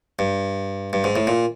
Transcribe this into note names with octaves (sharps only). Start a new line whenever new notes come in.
G2
G2
G#2
A2
A#2